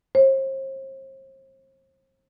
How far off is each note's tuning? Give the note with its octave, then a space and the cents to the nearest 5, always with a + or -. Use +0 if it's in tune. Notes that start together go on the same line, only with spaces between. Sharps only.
C5 +40